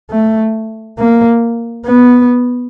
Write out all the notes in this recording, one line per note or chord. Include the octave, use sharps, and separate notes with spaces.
A3
A#3
B3